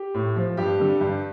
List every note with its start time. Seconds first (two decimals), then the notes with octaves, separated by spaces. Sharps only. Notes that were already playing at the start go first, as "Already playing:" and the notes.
Already playing: G4
0.14 A2
0.36 F3
0.57 G2 G4
0.80 D3 G3
1.01 G2